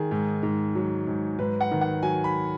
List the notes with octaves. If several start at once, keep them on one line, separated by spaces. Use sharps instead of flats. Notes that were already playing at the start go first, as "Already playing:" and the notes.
Already playing: D#3 G#4
G#2
G#2
F#3
G#2
G#2 B4
F#5
D#3
F#5
F#3 G#5
B5